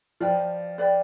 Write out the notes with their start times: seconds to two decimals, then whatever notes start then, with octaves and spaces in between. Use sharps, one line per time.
0.20 F3 B4 D5 G5
0.78 B4 D5 G5